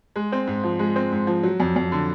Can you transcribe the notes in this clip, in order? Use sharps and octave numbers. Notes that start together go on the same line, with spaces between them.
G#3
C4
G#2
F3
G#3
C4
G#2
F3
F#3
F2
F2
D3